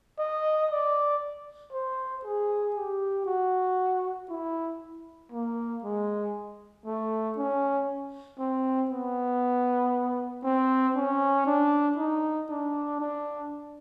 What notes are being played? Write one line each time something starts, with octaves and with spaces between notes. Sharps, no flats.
D#5
D5
C5
G#4
G4
F#4
E4
A#3
G#3
A3
C#4
C4
B3
C4
C#4
D4
D#4
D4
D4